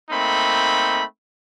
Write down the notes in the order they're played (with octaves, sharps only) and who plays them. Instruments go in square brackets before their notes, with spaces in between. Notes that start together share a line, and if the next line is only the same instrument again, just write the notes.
[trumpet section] A3 A#3 C4 D#4 B5